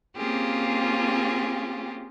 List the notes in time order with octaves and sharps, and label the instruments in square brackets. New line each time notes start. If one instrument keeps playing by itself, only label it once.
[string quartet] A#3 C4 C#4 F4 G4 G#4